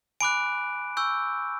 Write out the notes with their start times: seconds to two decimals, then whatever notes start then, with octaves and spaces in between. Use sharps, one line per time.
0.21 G#5 B5 D6 F#6 D7
0.97 G#5 C#6 E6 G6